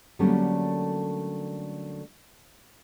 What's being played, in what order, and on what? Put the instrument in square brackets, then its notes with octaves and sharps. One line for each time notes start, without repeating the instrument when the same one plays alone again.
[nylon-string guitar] D3 F#3 G3 A3 A#3 C#4